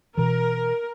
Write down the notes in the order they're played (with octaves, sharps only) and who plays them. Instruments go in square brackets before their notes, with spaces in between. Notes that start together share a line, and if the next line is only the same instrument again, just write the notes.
[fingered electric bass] B2 E3 [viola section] A#4